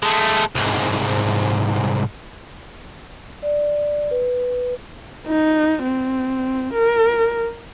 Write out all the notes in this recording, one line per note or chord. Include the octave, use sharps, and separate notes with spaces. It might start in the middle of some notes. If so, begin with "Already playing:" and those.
G#3 A3
C2 G#2
D5
B4
D#4
C4
A#4